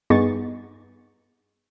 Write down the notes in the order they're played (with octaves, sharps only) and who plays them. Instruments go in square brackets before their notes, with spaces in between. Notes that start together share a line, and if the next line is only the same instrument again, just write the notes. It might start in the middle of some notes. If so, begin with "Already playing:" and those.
[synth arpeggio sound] G2 B3 D#4 G#4 C#6 A6